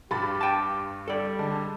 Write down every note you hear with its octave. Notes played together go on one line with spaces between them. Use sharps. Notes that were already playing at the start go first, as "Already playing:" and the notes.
G2 G4 B5 A6
G5 A5
G3 A4 D5
D3 G#3